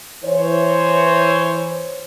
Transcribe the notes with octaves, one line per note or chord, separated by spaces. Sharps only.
E3 C5 C#5